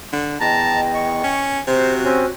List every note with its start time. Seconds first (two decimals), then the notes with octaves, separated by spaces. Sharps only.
0.13 D3
0.40 E2 D#5 G5 A5 A#5
0.95 C#6
1.24 C#4
1.67 C3 F#4 C5
2.04 C4 C#4